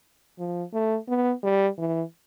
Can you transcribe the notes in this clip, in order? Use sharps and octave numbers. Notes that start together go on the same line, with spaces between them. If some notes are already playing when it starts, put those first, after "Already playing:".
F3
A3
B3
G3
E3